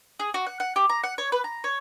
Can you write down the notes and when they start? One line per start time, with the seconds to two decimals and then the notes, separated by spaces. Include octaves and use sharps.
0.20 G#4
0.34 F#4
0.46 F#5
0.60 F#5
0.76 G4
0.89 A#5
1.04 F#5
1.18 C#5
1.32 B4
1.44 A#5
1.64 C#5